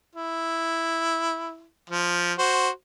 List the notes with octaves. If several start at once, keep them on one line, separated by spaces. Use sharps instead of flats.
E4
F3
F#4 C5